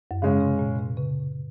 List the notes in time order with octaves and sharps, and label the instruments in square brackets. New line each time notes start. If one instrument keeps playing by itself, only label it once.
[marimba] F#2
[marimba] G#2 [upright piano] C#3 G#3 C#4
[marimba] C3
A#2
C3
C#3